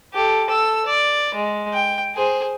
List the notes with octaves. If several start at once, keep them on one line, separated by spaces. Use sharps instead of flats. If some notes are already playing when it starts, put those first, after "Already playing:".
G4 A4
A4 E6
D5
G#3
G5
G#4 C5